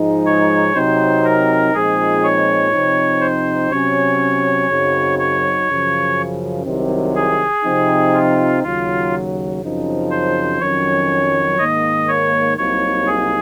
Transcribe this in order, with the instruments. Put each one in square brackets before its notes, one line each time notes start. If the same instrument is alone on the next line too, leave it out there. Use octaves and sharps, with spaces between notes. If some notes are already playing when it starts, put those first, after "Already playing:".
Already playing: [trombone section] G#2 F3 G#3 D#4
[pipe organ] C#5
[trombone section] C3 F#3 C4 D#4 [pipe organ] C5
[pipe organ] A#4
[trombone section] A#2 F3 G#3 C4 D#4 [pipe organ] G#4
[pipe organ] C#5
[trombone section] C3 F3 C4 D#4
[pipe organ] C5
[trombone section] C3 F#3 C#4 [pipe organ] C#5
[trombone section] F#2 C#3 F#3 C4 D#4
[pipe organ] C#5
[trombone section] F#2 C#3 F3
C2 C3 D#3 F#3 C4
[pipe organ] G#4
[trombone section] C3 F3 C4 D#4
[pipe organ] F4
[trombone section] D#2 C#3 F#3 [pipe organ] F4
[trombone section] F#2 C#3 F3 C4 D#4
[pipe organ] C5
[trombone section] F2 D#3 F#3 C#4 [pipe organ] C#5
[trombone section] G#2 D#3 A#3 [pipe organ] D#5
[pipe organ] C#5
[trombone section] C2 C3 F#3 A#3 D#4 [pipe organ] C#5
[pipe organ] G#4